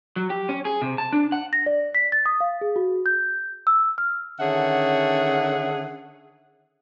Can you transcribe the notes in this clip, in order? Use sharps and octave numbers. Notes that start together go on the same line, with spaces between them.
F#3
G4
C#4
G#4
C3
A5
D4
F#5
A#6
D5
B6
A6
D#6
F5
G#4
F#4
G6
E6
F6
D3 D#3 C#4 G#4 E5 F#5